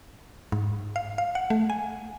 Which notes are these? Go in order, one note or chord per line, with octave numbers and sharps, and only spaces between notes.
G#2
F5
F5
F#5
A3
G#5